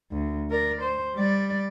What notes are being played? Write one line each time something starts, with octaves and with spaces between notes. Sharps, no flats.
D2
A#4 D5
C5
G3 D5